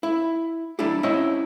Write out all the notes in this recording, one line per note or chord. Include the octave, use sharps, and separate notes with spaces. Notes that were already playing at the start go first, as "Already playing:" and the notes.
E4
G3 D4 E4 G4
C4 C#4 E4 D#5 E5 F#5